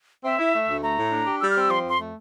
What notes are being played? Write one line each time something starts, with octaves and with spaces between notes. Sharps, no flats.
C4 E5
E4
A3
D2
A3 A#5
A2
D4
G4
G3 E6
F6
C4
E6
F3 C6
F2 C6
A3